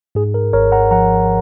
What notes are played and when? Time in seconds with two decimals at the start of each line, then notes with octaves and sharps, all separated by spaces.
0.15 G#2 G#4
0.34 A#4
0.53 G#1 A#4 C#5
0.72 F#5 A#5
0.91 F3 F#5 A#5